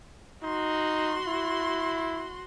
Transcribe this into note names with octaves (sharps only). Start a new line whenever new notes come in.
D#4 F#4 C6
E4